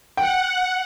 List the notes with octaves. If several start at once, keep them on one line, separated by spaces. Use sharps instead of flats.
F#5 G5